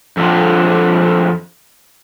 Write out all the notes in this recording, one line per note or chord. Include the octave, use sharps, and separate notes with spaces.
F2 D3